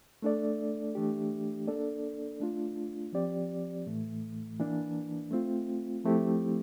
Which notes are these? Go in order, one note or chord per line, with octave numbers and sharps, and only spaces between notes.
A3 D4 A4 D5
E3 A3 D4 G4
A#3 D4 A4 D5
A3 D4 F4
F3 C4 G4 D5
A2 E3 A3
E3 A#3 D4
A3 C4 F4
F3 A3 C4 E4 G4